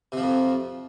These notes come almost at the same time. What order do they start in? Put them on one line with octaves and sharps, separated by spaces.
C3 F3 F2